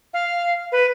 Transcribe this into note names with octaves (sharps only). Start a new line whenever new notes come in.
F5
B4